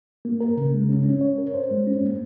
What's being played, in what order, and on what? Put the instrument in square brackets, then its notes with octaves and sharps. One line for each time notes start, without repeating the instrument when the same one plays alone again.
[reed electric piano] A#3
A#4
C#3
G#3
C#4
C#4
C#5
A#4
C5
G#3
C#4
A#3